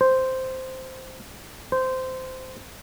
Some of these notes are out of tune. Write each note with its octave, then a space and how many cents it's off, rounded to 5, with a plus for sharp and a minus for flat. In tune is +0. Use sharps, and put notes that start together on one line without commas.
C5 -5
C5 -15